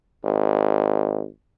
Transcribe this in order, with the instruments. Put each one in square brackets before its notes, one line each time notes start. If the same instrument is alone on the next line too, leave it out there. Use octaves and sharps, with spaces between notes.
[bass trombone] G#1